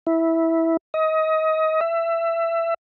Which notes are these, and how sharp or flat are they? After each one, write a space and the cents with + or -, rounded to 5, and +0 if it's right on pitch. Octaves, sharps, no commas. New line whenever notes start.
E4 -10
D#5 +25
E5 +20